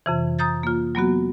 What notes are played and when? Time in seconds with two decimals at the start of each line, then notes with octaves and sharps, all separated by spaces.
0.06 F2 C3 E3
0.39 A#5 D#6 G6 A6
0.63 A#3 F4
0.95 F#3 A#3 B3 F#4